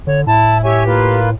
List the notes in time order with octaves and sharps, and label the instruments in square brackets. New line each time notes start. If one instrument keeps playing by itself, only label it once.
[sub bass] D3 [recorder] C#5
[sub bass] A2 [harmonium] E4 [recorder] A5
[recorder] G4 [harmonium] C#5 E5 G#5
[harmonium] A#3 F4 B4